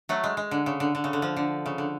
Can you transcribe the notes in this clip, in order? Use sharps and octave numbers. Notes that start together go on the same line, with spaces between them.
F#3 A3
G#3
G#3
D3
C#3
D3
D3
C#3
D3
F3
D3
C#3
D3